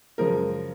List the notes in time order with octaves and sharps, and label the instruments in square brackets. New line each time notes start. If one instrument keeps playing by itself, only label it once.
[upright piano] F#2 C#3 F3 G#3 A#4